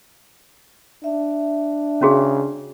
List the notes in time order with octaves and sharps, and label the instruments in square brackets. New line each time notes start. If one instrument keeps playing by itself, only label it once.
[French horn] D4 [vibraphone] E5
[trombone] C#3 [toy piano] C#4 F#4 G#4